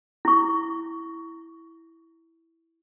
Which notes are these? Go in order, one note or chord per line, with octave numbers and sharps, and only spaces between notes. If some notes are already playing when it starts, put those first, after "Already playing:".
E4 C#6